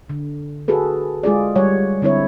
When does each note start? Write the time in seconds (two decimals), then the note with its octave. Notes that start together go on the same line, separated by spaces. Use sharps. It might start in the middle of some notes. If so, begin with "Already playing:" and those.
0.09 D3
0.68 F#4 G#4 A4 B4
1.23 G#3 F4 G#4 D5
1.56 G3 C#5 F#5
2.02 D3 C4 E4 C#5